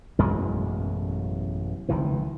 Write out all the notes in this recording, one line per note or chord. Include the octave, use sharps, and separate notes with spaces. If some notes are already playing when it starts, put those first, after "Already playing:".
A1 F#2 B2 G#3
F1 C#2 D#3 E3